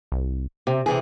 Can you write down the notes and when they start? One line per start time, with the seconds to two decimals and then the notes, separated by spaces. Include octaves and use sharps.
0.12 C2
0.67 C3 G4
0.86 C3 E3 G#4